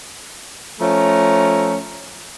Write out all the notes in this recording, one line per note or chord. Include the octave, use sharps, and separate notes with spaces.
F3 A3 C#4 A#5